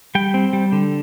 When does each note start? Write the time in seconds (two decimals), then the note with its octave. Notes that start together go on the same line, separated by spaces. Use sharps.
0.15 G3 G5
0.34 C4
0.53 G3
0.72 D3